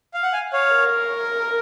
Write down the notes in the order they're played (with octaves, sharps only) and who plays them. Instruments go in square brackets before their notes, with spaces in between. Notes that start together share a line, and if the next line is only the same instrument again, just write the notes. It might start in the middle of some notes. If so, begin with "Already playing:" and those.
[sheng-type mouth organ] F5
F#5
F5 G#5
C#5 F5
[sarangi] A#4